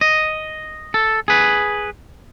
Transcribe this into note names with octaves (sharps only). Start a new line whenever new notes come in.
D#5
A4
G#4 B4